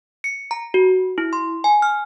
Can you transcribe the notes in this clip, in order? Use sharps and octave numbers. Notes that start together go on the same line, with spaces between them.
C#7
A#5
F#4
E4
C6
G#5
F6